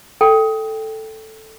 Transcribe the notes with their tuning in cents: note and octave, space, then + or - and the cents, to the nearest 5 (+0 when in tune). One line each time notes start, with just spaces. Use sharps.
A4 +0 G5 +0